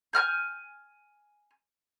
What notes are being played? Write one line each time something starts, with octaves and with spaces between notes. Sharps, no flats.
G#5 A#5 F6 G6